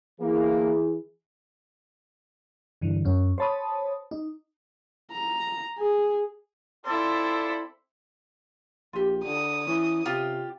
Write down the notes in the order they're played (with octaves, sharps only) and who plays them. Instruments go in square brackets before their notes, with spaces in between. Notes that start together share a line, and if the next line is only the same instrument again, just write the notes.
[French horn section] E3 G#4 [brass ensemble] A#3
[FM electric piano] G2 D3 E3
F#2 C#4
C5 C#5 A5 B5 D#6
D#4
[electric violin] A#5
G#4
[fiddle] C4 E4 [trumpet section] F4 A4 D5 [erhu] C5
[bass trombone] A#1 [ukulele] F4 G4
[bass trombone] D3 [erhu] D#6
[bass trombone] E3 [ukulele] C#4
[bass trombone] C3 [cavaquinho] F4 G4